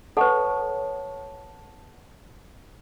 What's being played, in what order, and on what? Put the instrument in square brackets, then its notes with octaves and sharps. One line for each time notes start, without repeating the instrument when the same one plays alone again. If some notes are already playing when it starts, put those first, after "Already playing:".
[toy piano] A4 B4 [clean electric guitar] C#5 [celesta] F#5 A5